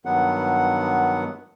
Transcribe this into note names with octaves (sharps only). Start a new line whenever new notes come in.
G2 D#3 F#3 B3 F#5